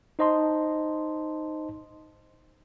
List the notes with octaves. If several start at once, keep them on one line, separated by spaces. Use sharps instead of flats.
D#4 C5 D#5 A5 C6